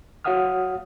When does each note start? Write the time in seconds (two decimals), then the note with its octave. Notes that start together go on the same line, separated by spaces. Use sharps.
0.25 F#4 C#5 F5 F#5 D#6 F6